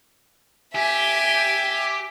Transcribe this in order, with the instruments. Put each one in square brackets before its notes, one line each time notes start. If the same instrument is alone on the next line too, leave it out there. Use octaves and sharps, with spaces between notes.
[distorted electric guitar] G4 [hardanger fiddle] E5 G#5